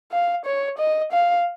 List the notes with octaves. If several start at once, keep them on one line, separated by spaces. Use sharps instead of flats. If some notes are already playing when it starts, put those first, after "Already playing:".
F5
C#5
D#5
F5